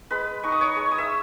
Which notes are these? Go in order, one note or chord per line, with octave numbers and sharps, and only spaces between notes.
G#3 B4 B5
D#4 C#6
D#6
C#5 C#6
G#3
D#6
E5 E6